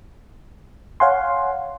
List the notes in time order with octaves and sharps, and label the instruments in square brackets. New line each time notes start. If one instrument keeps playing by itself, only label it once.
[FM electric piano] C#5 F5 F#5 G#5 C6